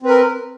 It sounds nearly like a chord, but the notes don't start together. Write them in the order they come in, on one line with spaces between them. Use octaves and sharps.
C4 B4 A#4